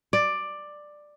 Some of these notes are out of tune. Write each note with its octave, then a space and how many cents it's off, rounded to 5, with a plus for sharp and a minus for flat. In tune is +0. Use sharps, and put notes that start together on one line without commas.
D5 +10